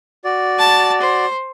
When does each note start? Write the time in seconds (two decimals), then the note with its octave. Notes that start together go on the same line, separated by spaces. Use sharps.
0.24 F#4 D5
0.59 A5
1.01 C5